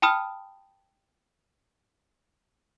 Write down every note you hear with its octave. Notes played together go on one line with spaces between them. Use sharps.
G5 A5 B5 D#6 F6